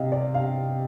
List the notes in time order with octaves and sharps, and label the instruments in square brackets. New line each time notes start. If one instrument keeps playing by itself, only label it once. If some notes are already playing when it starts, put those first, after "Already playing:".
Already playing: [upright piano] C3 D#5 F5
D5
F5